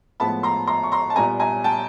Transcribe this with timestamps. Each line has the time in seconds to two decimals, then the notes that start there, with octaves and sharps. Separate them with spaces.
0.20 A2 F3 G#3 B3 A5 B5
0.43 A#5 C6
0.67 A#5 C6
0.83 C#6
0.92 A#5 C6
1.10 A5
1.16 A#2 G3 B3 G#5 A#5
1.40 G#5 A#5
1.64 G5 A5